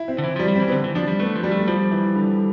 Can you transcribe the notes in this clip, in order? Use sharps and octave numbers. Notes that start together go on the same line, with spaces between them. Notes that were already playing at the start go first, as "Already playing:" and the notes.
Already playing: E4
C4
D3
E3
F3 G3
G3
C4
E3
B3
D3 C4
E3
F3 D4
G3
A3 B3
F3
G3
A3
F3 G3
E3
D3